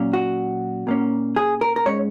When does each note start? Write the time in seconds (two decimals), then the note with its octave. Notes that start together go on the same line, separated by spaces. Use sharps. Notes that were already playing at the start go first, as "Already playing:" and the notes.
Already playing: A#2 F#3 C#4
0.13 F#4
0.87 A#2 A#3 C#4
1.36 G#4
1.61 A#4
1.76 A#4
1.85 G#2 G#3 C#4 C#5